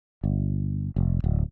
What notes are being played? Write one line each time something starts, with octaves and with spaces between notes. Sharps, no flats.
G1
F1
D1